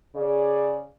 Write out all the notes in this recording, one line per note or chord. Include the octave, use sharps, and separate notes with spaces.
C#3 G#4 D5